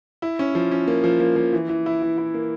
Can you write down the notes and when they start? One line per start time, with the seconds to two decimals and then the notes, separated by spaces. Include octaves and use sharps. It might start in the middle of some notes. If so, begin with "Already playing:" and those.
0.22 E4
0.39 C#4
0.55 F3
0.71 C#4
0.88 A#3
1.04 F3
1.20 A#3
1.36 F3
1.53 E3
1.69 E3
1.86 E4
2.02 E3
2.18 E4
2.34 A#3